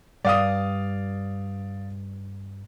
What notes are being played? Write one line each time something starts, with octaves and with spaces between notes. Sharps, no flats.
G2 D5 F5 D#6